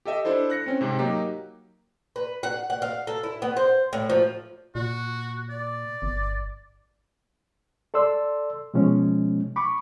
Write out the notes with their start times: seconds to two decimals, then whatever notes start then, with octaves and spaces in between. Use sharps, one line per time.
0.05 G4 A4 D#5 E5
0.25 D4 E4 A4 C5
0.50 F#6 A#6 C#7
0.66 C4 C#4
0.81 G#2 C3
0.99 F#3 A#3 D#4 G4
2.16 B4
2.43 F#5
2.70 F#5
2.82 F5
3.07 A4
3.23 E4
3.42 B3
3.57 C5
3.93 A2
4.10 F3
4.75 A#2 F#4
5.50 D5
6.02 G1
7.94 A4 D5 C6 E6
8.74 B2 F3 G#3 C#4
9.56 B5 C#6 D6